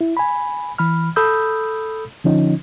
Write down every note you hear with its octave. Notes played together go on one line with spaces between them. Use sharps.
E4
G#5 B5
E3 B5 F6
A4 B5 D#6 E6 G6
D3 F3 C#4 D#4